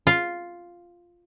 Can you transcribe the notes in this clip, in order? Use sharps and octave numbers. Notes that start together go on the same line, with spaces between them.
F4